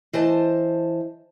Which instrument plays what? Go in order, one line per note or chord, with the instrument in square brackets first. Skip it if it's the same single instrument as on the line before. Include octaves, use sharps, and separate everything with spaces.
[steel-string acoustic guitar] E3 C5 D#5 A5